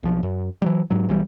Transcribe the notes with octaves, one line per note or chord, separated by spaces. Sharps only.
B1 F3
F#2
E3 F#3 G3
G#2 F#3
B1 E3 G3